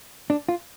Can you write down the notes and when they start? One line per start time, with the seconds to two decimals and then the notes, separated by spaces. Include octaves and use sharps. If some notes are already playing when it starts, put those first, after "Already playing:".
0.30 D4
0.49 F4